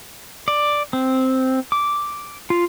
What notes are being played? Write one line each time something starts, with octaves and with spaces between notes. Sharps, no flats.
D5
C4
D6
F4